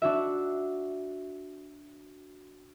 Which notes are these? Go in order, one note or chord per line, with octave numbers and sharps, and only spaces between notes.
D4 F#4 E5